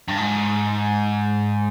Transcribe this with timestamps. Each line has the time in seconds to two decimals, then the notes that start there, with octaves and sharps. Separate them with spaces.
0.08 G2
0.18 G#2